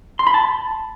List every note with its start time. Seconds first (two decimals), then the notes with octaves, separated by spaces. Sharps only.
0.19 C6
0.27 B5
0.34 A5